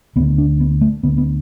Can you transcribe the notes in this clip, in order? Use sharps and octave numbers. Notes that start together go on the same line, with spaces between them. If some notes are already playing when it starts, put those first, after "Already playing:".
D2 D3 B3
D4
B3
A3
D2 D3 B3
B3